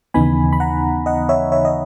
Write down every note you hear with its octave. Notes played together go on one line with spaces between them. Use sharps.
D#2 C#3 E3 B3 D#4 G#5 B5
B5
F#5 A#5
D#5 F#5
C#5 E5
C#5 E5
D#5